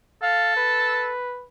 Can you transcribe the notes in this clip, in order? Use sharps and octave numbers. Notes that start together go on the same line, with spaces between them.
A4 F5
B4